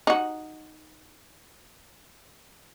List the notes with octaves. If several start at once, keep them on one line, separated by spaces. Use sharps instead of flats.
D#4 F#4